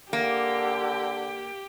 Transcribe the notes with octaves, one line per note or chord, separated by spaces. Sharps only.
D3 A#3 G4